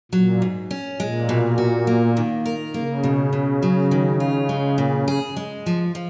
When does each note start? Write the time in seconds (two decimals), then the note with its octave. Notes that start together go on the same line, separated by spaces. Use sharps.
0.12 A#2 F#3
0.42 G#2
0.71 C#4
0.99 A#2 G#3
1.29 B2
1.58 F#4
1.87 A#3
2.17 D#3
2.46 A#4
2.74 C#3 A#3
3.04 B2
3.33 B2
3.63 F#3
3.91 D#3
4.20 F4
4.49 G#3
4.78 A#2
5.08 G#4
5.36 G#3
5.66 F3
5.95 F3